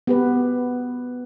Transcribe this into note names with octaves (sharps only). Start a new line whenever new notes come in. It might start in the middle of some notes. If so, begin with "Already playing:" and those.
B3 G4 B4